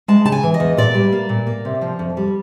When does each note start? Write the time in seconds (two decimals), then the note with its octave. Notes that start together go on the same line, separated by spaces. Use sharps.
0.08 G#3 A5
0.25 C#3 A5
0.32 G#5
0.43 E3
0.54 D#5
0.60 E2
0.77 A#2 D5
0.95 G3
1.12 A#3
1.29 A#2
1.47 A#3
1.65 C3
1.81 F3
1.99 F2
2.17 G3